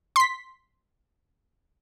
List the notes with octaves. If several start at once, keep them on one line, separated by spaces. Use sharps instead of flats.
C6 B6